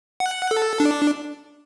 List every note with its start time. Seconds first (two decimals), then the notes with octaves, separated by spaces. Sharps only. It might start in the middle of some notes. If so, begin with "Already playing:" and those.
0.20 F#5
0.51 A4
0.80 D4